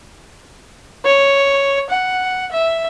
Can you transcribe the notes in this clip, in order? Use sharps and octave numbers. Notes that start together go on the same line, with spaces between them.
C#5
F#5
E5